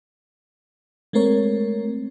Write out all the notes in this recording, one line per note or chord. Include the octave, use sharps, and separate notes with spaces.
G#3 A3 C4 A#4 C#5